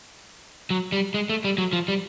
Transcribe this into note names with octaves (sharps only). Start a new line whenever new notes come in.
F#3
G3
G#3
A3
G3
F#3
F3
G3